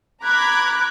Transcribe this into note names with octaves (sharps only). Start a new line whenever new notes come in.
A#5 B5 D6 F#6 G#6